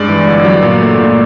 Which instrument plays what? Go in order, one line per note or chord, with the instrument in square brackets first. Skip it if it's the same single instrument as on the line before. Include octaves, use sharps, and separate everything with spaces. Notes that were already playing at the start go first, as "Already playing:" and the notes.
Already playing: [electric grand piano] G2 G#3 D5
E3
G1
F#3
A#2
A3
A#2